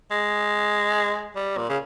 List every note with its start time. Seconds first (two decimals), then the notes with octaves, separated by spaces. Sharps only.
0.11 G#3
1.35 G3
1.57 A#2
1.69 C#3